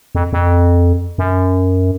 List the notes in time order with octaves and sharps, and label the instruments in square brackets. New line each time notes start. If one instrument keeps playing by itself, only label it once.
[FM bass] F2
F2
F#2